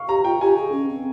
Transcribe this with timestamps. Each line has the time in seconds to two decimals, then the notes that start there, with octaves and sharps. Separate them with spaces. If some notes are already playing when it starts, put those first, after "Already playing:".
Already playing: F5 C#6
0.08 G4 A#5
0.25 F4 G5
0.41 G4 G#5
0.56 G#4
0.72 C#4
0.89 C4